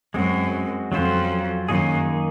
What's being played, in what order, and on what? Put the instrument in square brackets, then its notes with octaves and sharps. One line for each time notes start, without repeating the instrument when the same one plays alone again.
[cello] F#2 [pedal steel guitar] G#3 C4 F#4
[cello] F2 [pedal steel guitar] F#3 C#4 F4 C5
[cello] F#2 [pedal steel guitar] D#3 A#3 D#4 G#4